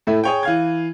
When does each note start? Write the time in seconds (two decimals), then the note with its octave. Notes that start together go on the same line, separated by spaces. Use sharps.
0.07 A2 A3 E4
0.24 G#4 C#5 G5
0.43 E3 F5 G#6